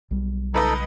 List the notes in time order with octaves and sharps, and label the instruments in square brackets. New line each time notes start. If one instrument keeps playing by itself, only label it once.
[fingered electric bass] B1 G3
[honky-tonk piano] C#2 B4 D#5 [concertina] D#4 A4